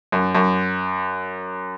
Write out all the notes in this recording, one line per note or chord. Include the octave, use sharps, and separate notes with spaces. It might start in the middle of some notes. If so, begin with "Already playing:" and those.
F#2
F#2